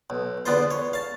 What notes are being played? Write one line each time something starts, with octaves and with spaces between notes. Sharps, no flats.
B1
E2 D3 B3 F4 C5
C#5
F5 A5